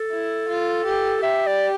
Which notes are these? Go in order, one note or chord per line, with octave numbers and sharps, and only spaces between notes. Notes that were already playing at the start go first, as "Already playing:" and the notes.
Already playing: A4
E4
F4
G4
G4 E5
D5